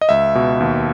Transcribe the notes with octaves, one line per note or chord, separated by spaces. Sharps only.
D#5
C#2 E5
B2
D#2